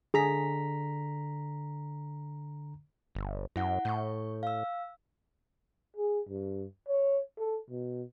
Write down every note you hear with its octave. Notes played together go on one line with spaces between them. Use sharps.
D3 G#4 A#5 B6
G1
F#2 E4 F#5
A2 C#6 G6
F5 E6
G#4
G2
C#5
A4
B2